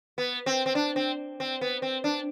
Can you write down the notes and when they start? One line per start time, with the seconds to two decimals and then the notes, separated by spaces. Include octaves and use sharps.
0.18 B3
0.46 C4
0.66 C4
0.75 D4
0.96 C4
1.40 C4
1.61 B3
1.82 C4
2.04 D4